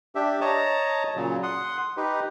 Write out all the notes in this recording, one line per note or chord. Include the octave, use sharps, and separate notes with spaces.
D4 G4 E5
C#5 D#5 A5 A#5
A#2 C#3 F#3
F#5 C6 D#6
D#4 G4 B4